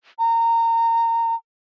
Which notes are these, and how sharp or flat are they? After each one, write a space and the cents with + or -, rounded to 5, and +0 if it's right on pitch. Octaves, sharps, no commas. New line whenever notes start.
A#5 -20